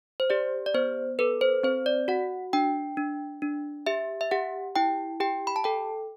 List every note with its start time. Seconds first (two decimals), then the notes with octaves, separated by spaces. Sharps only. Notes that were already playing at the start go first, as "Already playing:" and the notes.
0.20 C5
0.30 G4 D5
0.66 D5
0.74 B3 C5
1.19 A4 B4
1.41 C5
1.63 C4 C5
1.86 D5
2.08 F#4 F#5
2.53 D4 G5
2.97 D4
3.42 D4
3.86 G4 E5
4.21 E5
4.31 G4 F#5
4.76 E4 G5
5.20 G4 G5
5.47 B5
5.56 A5
5.64 A4 G5